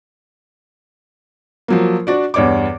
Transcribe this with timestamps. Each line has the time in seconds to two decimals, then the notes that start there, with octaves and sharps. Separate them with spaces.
1.68 F3 F#3 A#3
2.07 D4 F#4 D5
2.34 E2 G2 C#5 D5 D6